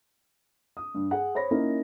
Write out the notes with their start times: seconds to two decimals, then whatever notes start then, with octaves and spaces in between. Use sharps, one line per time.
0.77 D#6
0.95 G2
1.11 G#4 F#5
1.35 C5 C#5 B5 A#6
1.51 A#3 C#4 D#4 E4